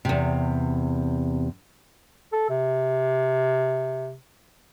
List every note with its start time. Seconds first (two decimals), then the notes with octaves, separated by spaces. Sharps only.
0.05 E2 C3
2.32 A4
2.50 C3